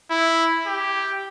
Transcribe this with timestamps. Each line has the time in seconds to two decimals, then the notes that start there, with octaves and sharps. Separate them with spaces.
0.10 E4
0.67 G4